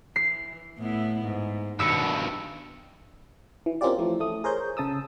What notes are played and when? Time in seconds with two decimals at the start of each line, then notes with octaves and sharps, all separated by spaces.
0.16 E3 C7
0.78 A2 B3 E4
1.25 G#2
1.79 G2 B2 D#3 E6 C#7
3.66 E3
3.81 A#3 C4 C#4 F4 G4 D5
3.99 E3 F3 A3
4.20 A3 D#6
4.44 G#4 A#4 C5 C#5 G6
4.77 C#3 A5 D#6 E6